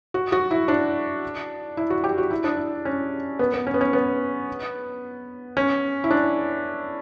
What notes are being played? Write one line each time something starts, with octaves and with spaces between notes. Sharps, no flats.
F#4
F#4
E4
D4
E4
F#4
G4
F#4
E4
D4
E4
C#4
B3
B3
C#4
B3
C#4
B3
C#4
E4
D4